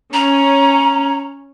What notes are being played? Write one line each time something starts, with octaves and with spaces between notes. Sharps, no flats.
C#4 A#5